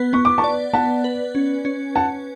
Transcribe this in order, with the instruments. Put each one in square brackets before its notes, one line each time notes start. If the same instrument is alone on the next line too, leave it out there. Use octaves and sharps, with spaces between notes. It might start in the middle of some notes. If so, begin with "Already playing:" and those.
Already playing: [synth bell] B3 B4
[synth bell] B3 [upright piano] C#6
[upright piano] D6
A5 C#6
[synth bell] D5
[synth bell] B3 [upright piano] F#5 A5
[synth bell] B4
C#4
C#4
[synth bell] C#4 [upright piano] F#5 A5